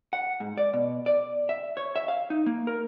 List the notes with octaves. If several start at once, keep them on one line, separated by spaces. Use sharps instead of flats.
F#5
G#2
D5
B2
D5
E5
C#5
E5
F5
D#4
A#3
A#4